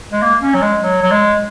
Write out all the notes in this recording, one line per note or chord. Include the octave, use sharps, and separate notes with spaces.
G#3
A#3
C#4
F#3
G#3
F#3
F#3
G#3